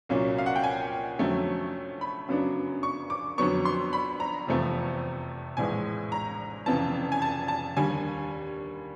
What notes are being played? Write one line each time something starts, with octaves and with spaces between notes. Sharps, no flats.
C2 A#2 F#3 A#3 C#4
F5
F#5
G5
G#5
F2 D3 F#3 A3 C#4
B5
F#2 C#3 F#3 B3 D4
C#6
D6
F2 D3 F#3 B3 C#6
C6
B5
A#5
F1 E2 C3 F3 A3
A#1 A2 E3 G#3 G#5
A#5
F1 F2 C#3 E3 A5
G#5
A5
A5
D#2 D3 G3 G#5